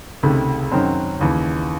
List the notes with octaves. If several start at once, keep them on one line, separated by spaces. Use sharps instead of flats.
C#2 C3 D#3 A3
F#2 D#3 F#3 C4
D#2 C#3 E3